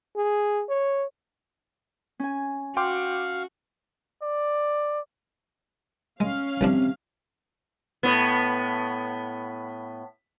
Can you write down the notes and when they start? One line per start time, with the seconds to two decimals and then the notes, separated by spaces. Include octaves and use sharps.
0.16 G#4
0.69 C#5
2.19 C#4 G#5
2.77 F#4 F5 G5 C6 D6
4.22 D5
6.20 G#3 C#4 F5
6.61 C2 C3 E3 F3 C4 D4
8.03 A2 B3